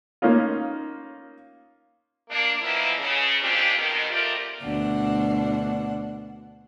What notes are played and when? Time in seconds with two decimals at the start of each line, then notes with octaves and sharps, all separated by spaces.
0.22 A#3 C#4 D#4 F4
2.30 A#3 D4
2.62 B2 E3 F3 A#3 B3 E4
2.99 C#3
3.41 G#3 A#3 C4 D4 F4 G4
3.78 B2 D#3
4.10 A3 C4 F4 G4 A#4 D5
4.63 D2 B2 D4 F#5